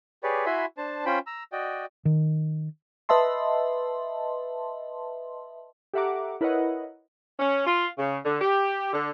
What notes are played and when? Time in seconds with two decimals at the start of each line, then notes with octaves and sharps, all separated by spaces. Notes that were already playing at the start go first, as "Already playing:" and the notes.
0.23 G4 G#4 B4 C#5 D5
0.46 E4 F#4 E5 G#5 B5 C6
0.77 D4 C5 A5
1.06 C#4 F4 C5 G5 B5
1.27 A#5 E6
1.52 F#4 D5 D#5 G5
2.05 D#3
3.09 B4 D#5 E5 A5 C6
5.94 G4 A4 E5 F#5 A#5 D6
6.41 E4 A#4 B4 C#5 D#5 F#5
7.40 C#4
7.67 F4
7.98 C#3
8.24 D3
8.40 G4
8.93 D3